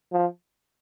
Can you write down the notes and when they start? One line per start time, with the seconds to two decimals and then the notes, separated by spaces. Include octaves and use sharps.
0.12 F3